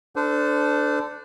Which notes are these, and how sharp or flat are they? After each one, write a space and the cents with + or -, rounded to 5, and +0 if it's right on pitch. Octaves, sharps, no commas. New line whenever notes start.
D4 +0 A4 +0 C5 -30